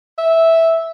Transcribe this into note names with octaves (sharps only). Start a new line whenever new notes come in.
E5